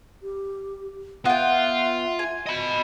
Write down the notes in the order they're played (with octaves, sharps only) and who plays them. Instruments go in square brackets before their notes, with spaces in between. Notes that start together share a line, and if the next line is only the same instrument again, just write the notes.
[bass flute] G4
[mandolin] B3 G5 [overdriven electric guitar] F4 [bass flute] E5
[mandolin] G#5
[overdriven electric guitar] D#5 B5